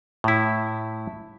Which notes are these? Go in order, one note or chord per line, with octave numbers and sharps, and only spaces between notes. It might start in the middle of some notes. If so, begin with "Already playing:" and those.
A2 E4